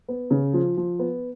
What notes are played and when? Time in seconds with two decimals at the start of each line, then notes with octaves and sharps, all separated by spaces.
0.08 B3
0.31 C#3
0.54 F3
0.77 F3
0.99 B3